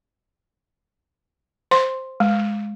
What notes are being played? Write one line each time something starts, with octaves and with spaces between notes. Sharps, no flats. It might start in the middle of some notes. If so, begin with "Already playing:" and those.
C5 C6
G#3